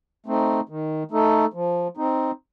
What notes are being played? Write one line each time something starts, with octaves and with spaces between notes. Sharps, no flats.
A3 C4 D#4
D#3
A3 D#4 A4
F3
C4 D#4